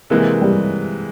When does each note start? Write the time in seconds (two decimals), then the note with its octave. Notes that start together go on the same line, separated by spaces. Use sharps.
0.10 C3 E3 G#3 A#3
0.42 G3